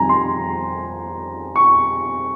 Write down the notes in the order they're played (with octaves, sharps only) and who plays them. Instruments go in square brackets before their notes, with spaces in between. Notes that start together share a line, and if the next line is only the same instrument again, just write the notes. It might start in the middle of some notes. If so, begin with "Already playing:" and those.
Already playing: [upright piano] F2 D#3 G3 G#5 A#5
C6
C#6